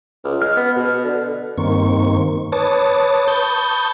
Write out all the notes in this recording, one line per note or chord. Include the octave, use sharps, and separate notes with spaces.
C#2
G#3 F6
B3
B2
D3
G2 D#3 A#3 C4 C#6
B4 C#5 A5 D6 D#6
A5 B5 C#6 D#6 G6